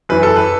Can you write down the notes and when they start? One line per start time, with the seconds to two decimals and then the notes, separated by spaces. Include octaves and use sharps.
0.09 F#2 E3 B4
0.23 A4
0.36 B4